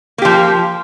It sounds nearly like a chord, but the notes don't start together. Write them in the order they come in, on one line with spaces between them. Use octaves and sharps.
A#3 G4 F3